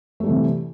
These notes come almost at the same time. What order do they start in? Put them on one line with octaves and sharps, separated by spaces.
A3 G3 E3 C3